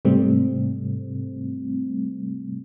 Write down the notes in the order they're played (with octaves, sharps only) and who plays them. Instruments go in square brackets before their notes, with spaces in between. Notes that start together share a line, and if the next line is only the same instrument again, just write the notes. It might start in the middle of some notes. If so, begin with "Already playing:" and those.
[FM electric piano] G#2 C3 G3 A3 C4